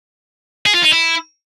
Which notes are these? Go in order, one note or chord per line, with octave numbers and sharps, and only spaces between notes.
G#4
F4
D#4
E4